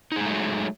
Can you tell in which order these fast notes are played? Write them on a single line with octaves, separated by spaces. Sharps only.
D#4 G#4 G#3 A3 F#3